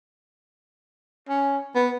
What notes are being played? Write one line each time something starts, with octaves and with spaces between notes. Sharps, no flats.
C#4
B3